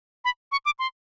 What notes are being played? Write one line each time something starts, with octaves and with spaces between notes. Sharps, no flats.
B5
C#6
D6
C6